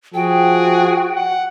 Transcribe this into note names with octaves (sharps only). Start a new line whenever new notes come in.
F3 F#4 G#4 G5
F#5